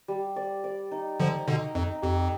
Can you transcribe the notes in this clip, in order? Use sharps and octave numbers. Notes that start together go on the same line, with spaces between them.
G3
D5
D5
D#4
D3 F3 D5
B2 D3 D#4
F2 D#4
F2 G4